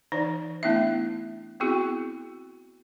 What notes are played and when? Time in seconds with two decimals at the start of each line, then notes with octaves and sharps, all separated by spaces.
0.12 E3 D#4 C#5 D5
0.63 A3 B3 D4 E4 E5
1.60 B3 C4 E4 F#4 G#4